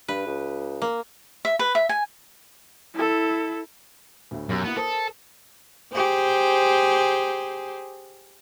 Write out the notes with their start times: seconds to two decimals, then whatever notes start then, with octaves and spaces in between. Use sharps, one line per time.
0.08 G2 B4
0.27 C#2
0.82 A#3
1.45 E5
1.59 B4
1.75 E5
1.89 G#5
2.94 E4 A4
4.31 D2 A2
4.49 B1 F#2 G4 E6
4.64 A#3 B3 E4
4.76 A4 A#4 C5 D#6
5.92 G4 G#4 C5